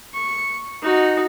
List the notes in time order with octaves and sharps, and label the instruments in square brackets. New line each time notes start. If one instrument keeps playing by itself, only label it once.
[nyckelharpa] C#6
D#4 F#4